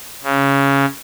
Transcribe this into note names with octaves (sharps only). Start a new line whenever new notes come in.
C#3